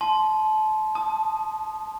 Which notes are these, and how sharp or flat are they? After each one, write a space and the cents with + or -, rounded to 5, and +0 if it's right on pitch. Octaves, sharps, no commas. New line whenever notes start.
A5 -30 C6 +0
A5 +0 D#6 -15